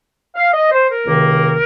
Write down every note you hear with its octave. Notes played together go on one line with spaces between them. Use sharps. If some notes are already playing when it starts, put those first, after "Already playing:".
F5
D#5
C5
A#4
C#2 C3 D#3 A#3